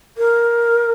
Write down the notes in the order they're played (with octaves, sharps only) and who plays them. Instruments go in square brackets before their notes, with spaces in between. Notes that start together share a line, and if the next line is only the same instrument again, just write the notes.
[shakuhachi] A#4